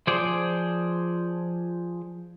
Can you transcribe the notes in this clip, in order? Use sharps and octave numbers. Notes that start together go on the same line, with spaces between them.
F3 G#4 C5 D5